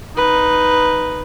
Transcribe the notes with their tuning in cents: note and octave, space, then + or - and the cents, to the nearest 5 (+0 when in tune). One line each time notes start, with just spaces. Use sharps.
D#4 +0 B4 +0